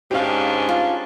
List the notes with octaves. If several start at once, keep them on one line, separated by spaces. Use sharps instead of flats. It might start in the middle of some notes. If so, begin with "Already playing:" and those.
G#2 C#4 D4 G4 F5
F4